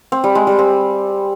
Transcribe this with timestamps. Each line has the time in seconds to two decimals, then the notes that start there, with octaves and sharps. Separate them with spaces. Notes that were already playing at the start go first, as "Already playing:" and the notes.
0.12 C4
0.24 G3
0.35 G#3
0.47 G3
0.59 C4